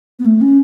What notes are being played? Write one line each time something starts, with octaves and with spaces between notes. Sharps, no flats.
B3
A3
C#4